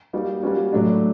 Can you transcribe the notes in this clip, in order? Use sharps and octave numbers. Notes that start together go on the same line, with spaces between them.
G3 A#3 D#4 F#4
G3 A#3 C#4 F#4
A2 F#3 A3 D4